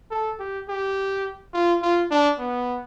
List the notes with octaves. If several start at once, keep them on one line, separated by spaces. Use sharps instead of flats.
A4
G4
G4
F4
F4
D4
B3